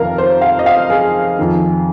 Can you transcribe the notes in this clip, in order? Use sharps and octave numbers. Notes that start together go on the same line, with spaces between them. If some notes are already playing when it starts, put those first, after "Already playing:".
Already playing: F2 C3 D#3 A#4 F5
C5
F5
D#5
F5
G#4
F2 D#3